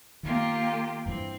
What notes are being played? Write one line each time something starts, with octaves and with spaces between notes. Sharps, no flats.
D#3 A#3 F4 G4
G2 E3 C4